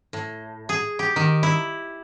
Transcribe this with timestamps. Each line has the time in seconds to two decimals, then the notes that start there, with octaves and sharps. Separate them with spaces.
0.13 A2
0.69 G#4
0.99 G4
1.16 D#3
1.43 E4